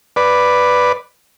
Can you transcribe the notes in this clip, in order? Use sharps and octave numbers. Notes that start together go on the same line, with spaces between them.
B4 D5